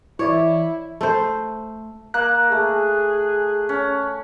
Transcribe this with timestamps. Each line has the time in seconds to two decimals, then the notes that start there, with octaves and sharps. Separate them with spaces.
0.19 E3 E4 C#5 D5
1.01 A3 C5
2.14 A#3 F#6
2.52 A3 G#4
3.69 C#4